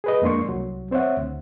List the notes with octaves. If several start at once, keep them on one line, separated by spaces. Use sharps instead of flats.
G#4 B4 D#5
F2 G#3 A#3 D4 C6 C#6
C2 F#3
C4 C5 C#5 E5 F#5
D2